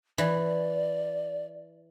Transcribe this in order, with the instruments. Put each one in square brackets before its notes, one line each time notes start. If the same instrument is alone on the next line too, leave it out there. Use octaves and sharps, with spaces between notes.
[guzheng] E3 [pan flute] D5